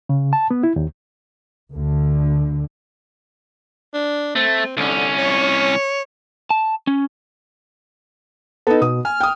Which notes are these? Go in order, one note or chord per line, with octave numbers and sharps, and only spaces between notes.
C#3
A5
B3
E4
D#2
D2 D3
D4
A3 C4
C2 D3 C#4
C#5
A5
C#4
B3 D#4 A4
B2 D#6
G#5 F6
G5 D#6